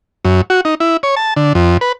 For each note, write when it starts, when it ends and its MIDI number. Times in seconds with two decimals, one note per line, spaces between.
0.25 0.41 42
0.50 0.61 66
0.65 0.75 63
0.80 0.97 64
1.03 1.15 73
1.16 1.34 81
1.36 1.53 50
1.55 1.77 41
1.81 1.92 71